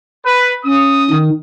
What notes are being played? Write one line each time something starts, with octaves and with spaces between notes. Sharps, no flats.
B4
C#4 D#6
D#3